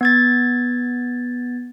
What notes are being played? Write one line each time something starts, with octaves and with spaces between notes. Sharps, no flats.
B3 G#6 A6